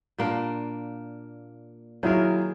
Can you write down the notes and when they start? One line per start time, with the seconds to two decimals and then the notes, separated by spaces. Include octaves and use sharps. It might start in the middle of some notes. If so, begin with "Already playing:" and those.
0.18 A#2 A#3 D4
2.03 D#3 F#3 E4 F4 G#4 A#4